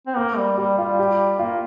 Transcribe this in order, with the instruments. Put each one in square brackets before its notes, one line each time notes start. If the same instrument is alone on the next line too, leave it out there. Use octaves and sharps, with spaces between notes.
[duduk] C4
[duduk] A#3 [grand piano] A#4
[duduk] G3
[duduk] G3 [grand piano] G4
[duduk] G3 [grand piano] F4
[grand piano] G4
[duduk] A#3 [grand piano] F4